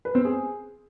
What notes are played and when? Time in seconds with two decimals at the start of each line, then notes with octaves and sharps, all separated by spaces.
0.05 B4
0.15 C4
0.25 G#4